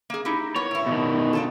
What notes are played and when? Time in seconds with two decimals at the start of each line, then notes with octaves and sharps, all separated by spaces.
0.10 A#3 G#4
0.25 D#4 E4 G4
0.56 A#3 B3 C#5
0.71 A2 E4
0.86 B2 D#3
1.33 D4 F4 A4